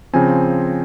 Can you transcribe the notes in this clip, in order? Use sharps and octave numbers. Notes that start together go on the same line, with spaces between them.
C#3 F3 C4 G#5